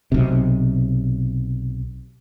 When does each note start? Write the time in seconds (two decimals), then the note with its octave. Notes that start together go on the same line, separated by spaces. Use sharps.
0.12 B1 C3